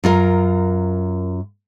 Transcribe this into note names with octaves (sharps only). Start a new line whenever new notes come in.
F#2 F4 A#4